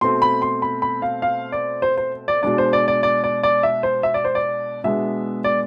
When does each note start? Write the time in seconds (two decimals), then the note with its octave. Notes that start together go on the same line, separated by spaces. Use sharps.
0.01 B2 A3 C4 C6
0.22 B5
0.42 C6
0.62 B5
0.82 B5
1.02 F5
1.22 F5
1.52 D5
1.82 C5
1.97 C5
2.28 D5
2.43 B2 G#3 D4 D5
2.58 C5
2.73 D5
2.88 D5
3.03 D5
3.24 D5
3.43 D5
3.63 E5
3.83 C5
4.03 E5
4.14 D5
4.25 C5
4.35 D5
4.84 B2 G#3 B3 D4 E5
5.44 D5